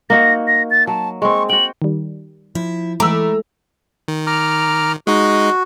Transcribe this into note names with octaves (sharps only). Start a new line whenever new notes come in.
A#3 D#4 F#4 A#6
A#6
A6
F#3 A5
G#3 C4 C#6
F#4 G5 F#7
D#3 G3
F3 E4
E3 G#3 A3 A#5 B5 D6 E6
D#3
A#5 D6 F6
G#3 D#4 F#4